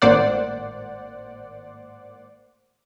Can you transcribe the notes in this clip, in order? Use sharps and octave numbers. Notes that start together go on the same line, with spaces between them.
G#1 A2 A#3 C5 D5 F#5